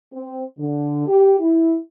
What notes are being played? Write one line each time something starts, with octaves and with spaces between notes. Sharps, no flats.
C4
D3
G4
E4